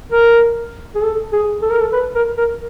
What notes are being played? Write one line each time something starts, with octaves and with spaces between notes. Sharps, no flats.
A#4
G#4
A4
G#4
A4
A#4
A4
B4
A#4
A#4